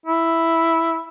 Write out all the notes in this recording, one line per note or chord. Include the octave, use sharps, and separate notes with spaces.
E4